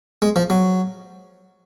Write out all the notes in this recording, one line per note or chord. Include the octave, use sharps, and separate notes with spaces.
G#3
F3
F#3